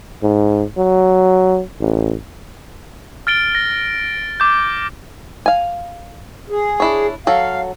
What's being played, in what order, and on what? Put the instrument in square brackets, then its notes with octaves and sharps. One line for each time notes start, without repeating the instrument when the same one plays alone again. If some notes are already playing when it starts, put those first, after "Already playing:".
[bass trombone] G#2
F#3
A1
[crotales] F6 A6 D7 G7
A#6
D6 G6
[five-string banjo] F5 G#5
[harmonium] G#4
[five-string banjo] D4 E4 C#5
[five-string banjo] F#3 A4 [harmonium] F5